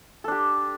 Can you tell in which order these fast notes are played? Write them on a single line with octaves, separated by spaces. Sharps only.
A4 D4 G4